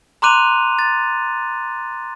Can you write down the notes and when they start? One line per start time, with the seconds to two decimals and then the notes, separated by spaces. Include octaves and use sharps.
0.22 A#5 C6 D6 F#6 D#7 F7
0.79 A6